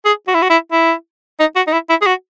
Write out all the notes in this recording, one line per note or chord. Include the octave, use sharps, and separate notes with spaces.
G#4
F#4
E4
F#4
E4
E4
D#4
F#4
D#4
E4
E4
G#4
F#4